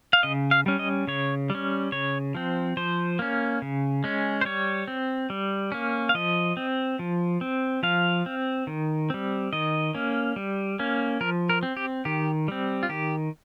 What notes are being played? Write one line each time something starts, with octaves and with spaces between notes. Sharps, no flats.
F5
C#3 D#5
F5
G3 C#4
D#5
C#3 C#5
G3
C#4
C#3 C#5
F3 C4
F3 C5
A#3 C#4
C#3
G#3 C#4
C5
G3 C#5
C4
G3
A#3 C#4
F5
F3 D#5
C4
F3
C4
F3 F5
C4
D#3
G3 C4
D#3 D#5
A#3 C#4
G3
A#3 C#4
F3 A#4
A#4
C4
G4
D#3 G4
G3 C4
F4
D#3 G4